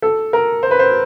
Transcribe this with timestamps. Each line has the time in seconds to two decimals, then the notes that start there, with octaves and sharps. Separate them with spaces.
0.02 A4
0.33 A#4
0.63 C5
0.71 B4
0.79 C5